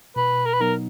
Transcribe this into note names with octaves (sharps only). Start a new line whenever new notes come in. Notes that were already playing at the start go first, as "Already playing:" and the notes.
B2 B4
A#4
B4
F#3 B3 D#4 A#4